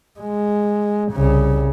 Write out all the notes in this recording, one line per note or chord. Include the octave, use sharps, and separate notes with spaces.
G#3
C2 C#3